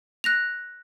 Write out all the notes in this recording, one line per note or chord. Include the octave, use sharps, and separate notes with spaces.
F#6 A#6 F7